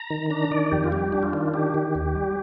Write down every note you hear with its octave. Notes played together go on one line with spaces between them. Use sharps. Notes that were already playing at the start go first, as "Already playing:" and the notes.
Already playing: A#5
D#3
D4 A#5
D#3 D5
F2 G4
F4
G3 G4
D4
F4
D#3
D4 G4
D#3
D#2
G3